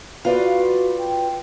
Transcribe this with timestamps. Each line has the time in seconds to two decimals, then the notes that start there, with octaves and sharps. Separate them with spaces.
0.25 F4 F#4 B4 D5 F5
0.99 G5